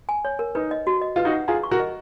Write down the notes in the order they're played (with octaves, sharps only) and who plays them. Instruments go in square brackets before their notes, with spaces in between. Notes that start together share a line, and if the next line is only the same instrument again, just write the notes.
[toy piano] G#5
C#5
A#4
[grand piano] D#4 [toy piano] B4
[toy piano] D#5
F#4
D#5
[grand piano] F4 [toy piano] B4
[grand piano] D#4 F#4
[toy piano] F#5
[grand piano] F4 G#4 [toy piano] A#5
[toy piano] C#6
[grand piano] F#4 A#4
[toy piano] D#5